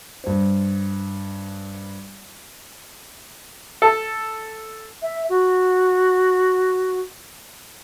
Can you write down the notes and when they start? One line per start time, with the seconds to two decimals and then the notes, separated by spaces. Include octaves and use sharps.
0.24 G2 C5
3.82 A4
5.02 E5
5.29 F#4